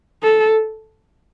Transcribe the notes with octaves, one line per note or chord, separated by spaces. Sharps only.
A4